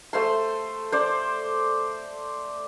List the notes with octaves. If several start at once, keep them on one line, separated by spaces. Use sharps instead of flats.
A3 C5 C6
C5 D5